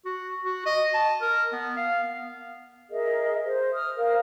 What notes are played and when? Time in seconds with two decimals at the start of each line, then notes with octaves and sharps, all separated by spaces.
0.06 F#4
0.44 F#4
0.66 D#5
0.94 A5
1.22 A#4
1.52 B3
1.77 F5
2.03 B3
2.91 G#4 A#4 D#5 E5
3.44 C5
3.73 D#6 F6
3.98 A#4 F5